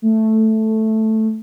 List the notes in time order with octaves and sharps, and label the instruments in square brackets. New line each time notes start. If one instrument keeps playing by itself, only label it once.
[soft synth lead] A3